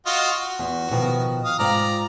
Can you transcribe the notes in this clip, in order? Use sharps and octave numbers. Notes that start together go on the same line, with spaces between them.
F4 F#4 D#5
F#4
E2
B2 D#3 F3
F5 D#6
G#2 F4 D5 G5 A#5